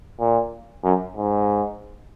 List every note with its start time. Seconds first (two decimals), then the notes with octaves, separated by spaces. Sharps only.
0.20 A#2
0.83 F#2
1.16 G#2